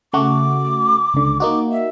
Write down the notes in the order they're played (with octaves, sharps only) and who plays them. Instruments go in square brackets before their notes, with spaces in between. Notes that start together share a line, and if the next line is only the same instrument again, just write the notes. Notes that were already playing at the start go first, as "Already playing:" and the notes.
[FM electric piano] C#3 A3 F#4 [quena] D6
[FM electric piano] C#2 D3
[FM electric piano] A#3 D#4 F#4 [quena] D6
[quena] E5